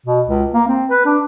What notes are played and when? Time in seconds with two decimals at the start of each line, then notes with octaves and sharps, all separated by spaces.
0.06 B2
0.27 C#2
0.54 A#3
0.68 C4
0.90 B4
1.05 D4